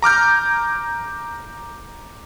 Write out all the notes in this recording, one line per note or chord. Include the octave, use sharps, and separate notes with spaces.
A#5 D6 F6 G6